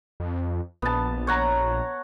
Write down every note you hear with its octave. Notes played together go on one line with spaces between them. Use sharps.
F2
A#1 B3 A5
C#5 F#5 A#5